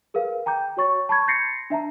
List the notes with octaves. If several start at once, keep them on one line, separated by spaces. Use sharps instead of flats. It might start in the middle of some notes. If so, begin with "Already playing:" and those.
G#4 A#4 B4 F5
G5 A#5 D6 G6
F#4 C#5 C#6 A6
A5 B5 C#6 G#6
C6 G6 A6 A#6 C7 C#7
D4 E5 A5 A#5